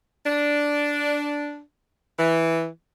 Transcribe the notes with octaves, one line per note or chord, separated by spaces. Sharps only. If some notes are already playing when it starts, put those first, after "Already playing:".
D4
E3